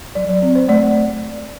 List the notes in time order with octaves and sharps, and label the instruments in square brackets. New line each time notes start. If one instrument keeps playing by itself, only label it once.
[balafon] F#3 D5
D5
C4
C5
A3 D5